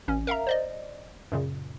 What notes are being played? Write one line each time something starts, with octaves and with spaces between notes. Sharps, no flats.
A1 C#4
A#4 E5 F5 A#5
C5 D5 D#5
F#2 A#2 C#3